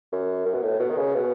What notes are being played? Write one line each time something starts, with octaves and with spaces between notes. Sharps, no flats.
F#2
F#2
B2
A2
B2
D#3
C#3
B2